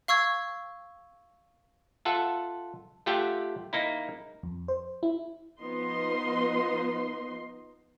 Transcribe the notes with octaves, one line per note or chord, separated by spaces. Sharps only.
F5 C#6 E6 G#6
F4 A4 E5 F#5
A3 F4 G4 E5 F#5 G5
A#3 D#4 E4
F2
C5
E4
F3 B3 D#4 D#5 C6